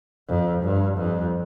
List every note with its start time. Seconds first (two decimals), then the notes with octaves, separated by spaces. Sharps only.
0.29 F2
0.63 G2
0.98 F2